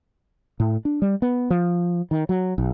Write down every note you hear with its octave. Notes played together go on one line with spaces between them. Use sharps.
A2
D4
G3
B3
F3
D#3
F#3
B1